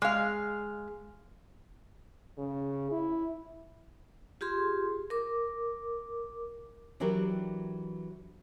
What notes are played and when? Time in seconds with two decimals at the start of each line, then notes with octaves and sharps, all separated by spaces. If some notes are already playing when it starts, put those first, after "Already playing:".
0.02 G#3 F5
2.38 C#3
2.92 E4
4.41 F4 G4 G#4 C6
5.10 A#4 D6
7.00 E3 F#3 D4 F#4 G4 A#4